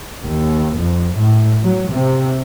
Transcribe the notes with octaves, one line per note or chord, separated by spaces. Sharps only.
D#2
F2
A2
F#3
C3